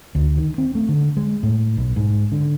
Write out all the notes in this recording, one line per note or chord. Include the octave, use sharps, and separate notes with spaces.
D2
D#3
C4
A3
D3
G#3
A2
B1
G#2
D3